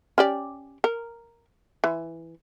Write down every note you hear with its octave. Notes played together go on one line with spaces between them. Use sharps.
C#4 G4 D5
A#4
E3